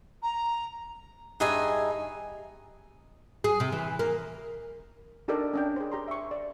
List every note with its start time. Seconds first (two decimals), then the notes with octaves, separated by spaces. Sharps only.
0.22 A#5
1.40 G2 D#4 G#4 D#5 E5 G#5
3.44 G#4
3.60 C3
3.72 E3
3.99 A#3
5.28 D4 D#4 G4 A4 A#4 D5
5.54 C#4 D4 G5
5.76 G#4 C5
5.92 G4 A#5 C6
6.08 E5 C#6
6.31 D5